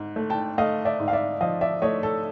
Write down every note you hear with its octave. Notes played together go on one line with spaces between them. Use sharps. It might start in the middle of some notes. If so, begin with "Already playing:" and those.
Already playing: G#2
A3
G5 A5
A3 D#5 F5
D5 E5
G#2
F5
D5 E5
F3 D#5 F5
D5 E5
A3 C#5 D#5
A4